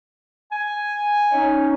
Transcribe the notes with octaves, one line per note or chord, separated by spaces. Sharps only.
G#5
C#4 D#4